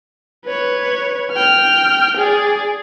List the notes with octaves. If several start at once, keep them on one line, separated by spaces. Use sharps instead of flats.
B4 C#5
G5 F6
G#4 D5